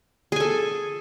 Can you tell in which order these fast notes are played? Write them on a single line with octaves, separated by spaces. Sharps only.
G#4 G#5 A4